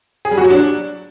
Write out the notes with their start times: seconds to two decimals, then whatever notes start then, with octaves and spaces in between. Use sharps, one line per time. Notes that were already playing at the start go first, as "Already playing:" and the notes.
0.25 G#4
0.31 G3
0.38 F#4
0.44 F#3
0.50 D4